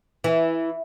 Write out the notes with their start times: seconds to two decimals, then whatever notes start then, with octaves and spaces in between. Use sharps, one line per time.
0.24 E3